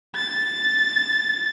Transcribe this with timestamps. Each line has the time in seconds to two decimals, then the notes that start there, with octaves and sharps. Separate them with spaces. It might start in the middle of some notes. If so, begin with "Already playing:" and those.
0.16 A6